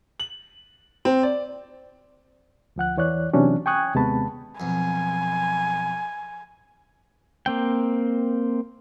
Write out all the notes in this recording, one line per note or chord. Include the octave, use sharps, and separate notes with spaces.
F#7
C4
D5
D2 F3 F#5 F#6
E2 E3 C#5 D5 F#6
C3 E3 F#3 C#4 D4
G5 G#5 C#6 D#6 F#6 G#6
D#2 C3 G#3 B3 A5 B5
B1 F2 G#5
A#3 C4 G5